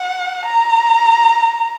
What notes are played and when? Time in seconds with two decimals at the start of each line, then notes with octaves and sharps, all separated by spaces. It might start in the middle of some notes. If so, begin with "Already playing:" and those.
Already playing: F#5
0.45 A#5